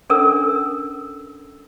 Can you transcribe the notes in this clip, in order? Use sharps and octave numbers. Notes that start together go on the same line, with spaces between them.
C#4 D4 A4 A#4 E6